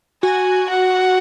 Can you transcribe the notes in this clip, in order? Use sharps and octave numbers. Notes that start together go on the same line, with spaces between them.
F#4 G#5
F#5